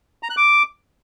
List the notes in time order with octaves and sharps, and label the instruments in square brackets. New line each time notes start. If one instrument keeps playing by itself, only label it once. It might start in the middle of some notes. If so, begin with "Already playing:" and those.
[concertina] A#5
F#6
D6